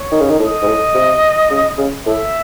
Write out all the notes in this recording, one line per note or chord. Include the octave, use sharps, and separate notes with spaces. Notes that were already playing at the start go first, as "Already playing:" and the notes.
Already playing: C#5
D#3
C#3
D#3
A2 D#5
G#2
A2
C3
C#3
C#3
A2 E5